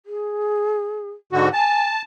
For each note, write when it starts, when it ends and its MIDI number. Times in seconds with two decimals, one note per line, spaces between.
0.06 1.11 68
1.33 1.49 44
1.33 1.49 50
1.33 1.49 66
1.53 1.85 80
1.53 2.02 81